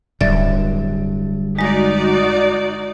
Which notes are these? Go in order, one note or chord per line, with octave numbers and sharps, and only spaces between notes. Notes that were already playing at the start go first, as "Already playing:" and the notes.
D1 G2 D3 F#3 D5 E5 A6
G#3 D#4 F#4 D5 A#6